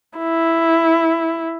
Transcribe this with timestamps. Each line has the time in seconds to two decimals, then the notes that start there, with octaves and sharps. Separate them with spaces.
0.18 E4